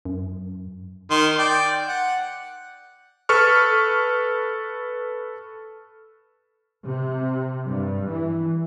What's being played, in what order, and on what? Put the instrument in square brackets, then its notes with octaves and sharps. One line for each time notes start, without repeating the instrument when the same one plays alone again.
[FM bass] F#2
[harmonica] D#3 C6
D5 G5
F#5
[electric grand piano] A4 B4 C#6 F6
[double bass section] C3
G2
E3